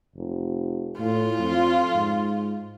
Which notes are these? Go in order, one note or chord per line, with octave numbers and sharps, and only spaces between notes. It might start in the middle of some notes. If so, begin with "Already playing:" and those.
F1
A2 F4
F2
G#2